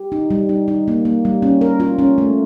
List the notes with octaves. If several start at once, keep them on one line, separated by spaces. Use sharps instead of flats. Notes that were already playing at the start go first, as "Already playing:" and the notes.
Already playing: G4
D#4
G3
D#4
D#4
A#3
A#3
G3
C#4
A#4
F4
C#4
A3